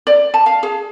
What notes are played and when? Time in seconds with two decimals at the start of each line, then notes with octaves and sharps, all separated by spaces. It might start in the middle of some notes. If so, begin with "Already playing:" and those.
0.07 D5
0.34 A5
0.46 F5
0.63 G#4